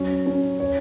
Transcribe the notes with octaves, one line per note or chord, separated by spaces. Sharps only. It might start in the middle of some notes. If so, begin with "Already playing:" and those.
Already playing: F#3 C#4
C#4
C#5